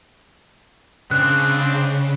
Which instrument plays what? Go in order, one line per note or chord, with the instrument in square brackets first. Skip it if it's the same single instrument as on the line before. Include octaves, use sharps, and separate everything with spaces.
[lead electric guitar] C#3 [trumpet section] G#3 C4 D4 [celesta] F#6